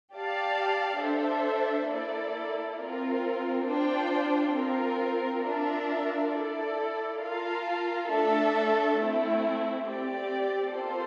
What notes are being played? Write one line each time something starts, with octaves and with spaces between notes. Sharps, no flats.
G4 D5 F5 A5
D4 A4 C5 E5
A#3 E4 A4 D5
C4 F4 A#4
D4 F4 C5 G5
C4 F4 A#4
D4 F4 A#4 E5
E4 A4 D5
F4 A#4 F5 A5
A3 D4 A4 E5 A5
A3 C4 E4
C4 G4 D5
A#3 F4 A4 C5